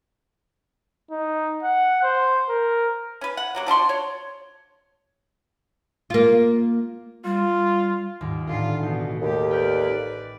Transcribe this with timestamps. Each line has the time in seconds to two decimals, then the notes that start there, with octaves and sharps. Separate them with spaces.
1.11 D#4
1.63 F#5
2.03 C5
2.49 A#4
3.21 C#4 B4
3.37 F#5
3.55 C3 F#3 A#3
3.66 F3 D4 F#4 C6
3.89 C#5
6.10 A#3 F4
7.25 G3 F4
8.21 D#2 G#2
8.49 A1 D3 F4 C7
8.83 B2 E3 D#4
9.21 D#2 A3 G4 A4
9.51 B4 D5 G5 F6